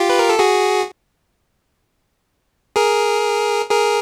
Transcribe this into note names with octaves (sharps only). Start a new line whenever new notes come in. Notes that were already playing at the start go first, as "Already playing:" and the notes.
Already playing: F4 G4
B4
A#4
A4
F#4 G#4
G#4 A#4
G#4 A#4